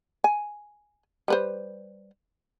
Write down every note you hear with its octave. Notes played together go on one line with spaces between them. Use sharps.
G#5
G3 B4 C5